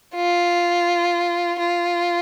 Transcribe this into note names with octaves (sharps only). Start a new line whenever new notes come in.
F4
F4